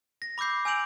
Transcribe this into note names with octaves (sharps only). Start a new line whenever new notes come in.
A#6
B5 D6 E6 G6 C7
G#5 E6 G6 D7 F7 F#7